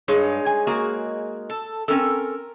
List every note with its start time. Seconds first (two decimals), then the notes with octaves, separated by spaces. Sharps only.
0.08 G2 G#3 D#4 C#5
0.46 G#5
0.67 A#3 F#4 G#4
1.50 A4
1.88 C4 C#4 A4 A#4